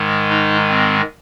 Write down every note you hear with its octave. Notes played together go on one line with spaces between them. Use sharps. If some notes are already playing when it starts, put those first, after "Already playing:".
Already playing: G#2 D#3 G#3
D#4
C4